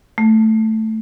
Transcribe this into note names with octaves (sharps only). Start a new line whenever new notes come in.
A3